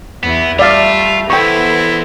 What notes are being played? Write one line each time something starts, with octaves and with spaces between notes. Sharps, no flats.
E2 E3 B3 E4
G3 A3 F4 D5 E5 F5
E2 B3 E4 A4 C5 G5 C#6